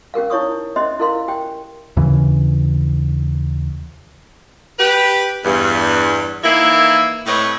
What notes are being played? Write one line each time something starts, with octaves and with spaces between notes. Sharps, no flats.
C#4 G4 A#4 F5
D#4 E4 C#5 C#6 D#6
C#4 G4 C5 D#5 E5 C6
E4 A4 A#4 F5 C6
G4 G5
D#2 C#3 E3
G4 B4
E2 G2
D#3 E3 A#3 E4
A2 A3 C4 B4 C#5 D#5